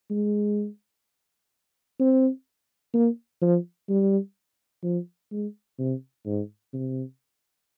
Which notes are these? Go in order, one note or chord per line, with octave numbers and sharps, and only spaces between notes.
G#3
C4
A#3
F3
G3
F3
G#3
C3
G#2
C3